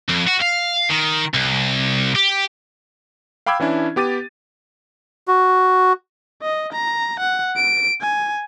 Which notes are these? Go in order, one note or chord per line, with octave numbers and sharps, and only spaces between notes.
F2
F#4
F5
D#3
C2
G4
F5 G5 B5 D6 E6 G#6
E3 C#4 D4 E4
B3 G4 D6 A6 D#7
F#4
D#5
A#5
F#5
D7
G#5